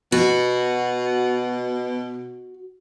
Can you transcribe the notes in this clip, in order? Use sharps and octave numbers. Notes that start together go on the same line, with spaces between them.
B2 F#4